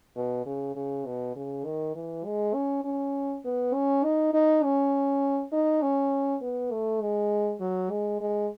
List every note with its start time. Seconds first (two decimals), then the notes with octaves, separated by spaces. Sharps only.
0.16 B2
0.46 C#3
0.76 C#3
1.06 B2
1.36 C#3
1.65 D#3
1.95 E3
2.25 G#3
2.54 C#4
2.85 C#4
3.45 B3
3.74 C#4
4.04 D#4
4.34 D#4
4.64 C#4
5.52 D#4
5.82 C#4
6.42 B3
6.72 A3
7.01 G#3
7.60 F#3
7.91 G#3
8.21 G#3